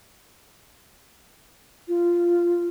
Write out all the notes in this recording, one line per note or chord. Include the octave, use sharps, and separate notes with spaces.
F4